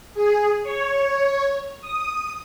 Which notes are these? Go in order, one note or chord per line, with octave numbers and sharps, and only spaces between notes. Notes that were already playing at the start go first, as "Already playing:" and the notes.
G#4
C#5
D#6